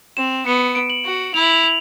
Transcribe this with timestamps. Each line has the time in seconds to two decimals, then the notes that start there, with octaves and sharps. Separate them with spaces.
0.17 C4 E7
0.46 B3 C#7
0.75 D7
0.90 F#7
1.05 F#4
1.34 E4 F7
1.43 F#7
1.53 F7
1.63 F7